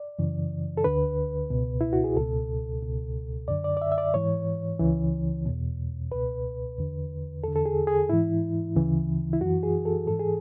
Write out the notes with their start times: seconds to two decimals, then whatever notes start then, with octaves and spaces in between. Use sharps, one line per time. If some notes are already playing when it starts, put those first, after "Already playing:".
Already playing: D5
0.19 F#2 C#3 E3
0.77 A4
0.84 D2 D3 B4
1.50 C#2 B2
1.81 E4
1.93 F#4
2.04 G#4
2.17 C#2 B2 A4
2.82 C#2 B2
3.48 F#2 D3 D5
3.64 D5
3.77 D5
3.82 E5
3.92 E5
3.98 D5
4.14 G#2 E3 C#5
4.80 C#2 C#3 E3
5.46 E2 B2
6.11 C#2 B2 B4
6.78 E2 D3
7.43 E2 A4
7.48 D3
7.56 A4
7.66 G#4
7.87 G#4
8.09 G#2 E3 E4
8.76 D2 C#3 E3
9.33 E4
9.41 F#2 E3 F#4
9.63 G#4
9.86 A4
10.07 G#2 E3 A4
10.20 G#4